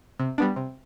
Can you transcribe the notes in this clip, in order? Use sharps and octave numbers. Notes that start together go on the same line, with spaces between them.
C3
G3 B3 D4
C3